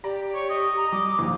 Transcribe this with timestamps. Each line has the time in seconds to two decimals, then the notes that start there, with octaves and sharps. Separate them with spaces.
0.04 G4 D5 A#5
0.34 C#5
0.50 D#5
0.77 A#5
0.92 G3 D6
1.19 A#1 D#2